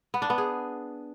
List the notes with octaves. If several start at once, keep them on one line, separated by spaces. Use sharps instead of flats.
B3
D4
B3
G#4